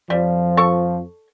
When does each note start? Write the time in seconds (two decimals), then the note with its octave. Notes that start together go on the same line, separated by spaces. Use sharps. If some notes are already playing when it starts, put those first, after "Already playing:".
0.10 F2 F3 G3
0.57 A4 C#6